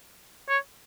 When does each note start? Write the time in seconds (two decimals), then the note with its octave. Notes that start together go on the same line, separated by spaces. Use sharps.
0.49 C#5